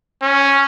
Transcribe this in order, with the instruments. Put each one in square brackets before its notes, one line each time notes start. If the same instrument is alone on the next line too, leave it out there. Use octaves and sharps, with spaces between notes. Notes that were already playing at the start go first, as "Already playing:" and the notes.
[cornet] C#4